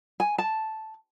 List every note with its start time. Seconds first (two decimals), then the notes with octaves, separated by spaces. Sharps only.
0.20 G#5
0.38 A5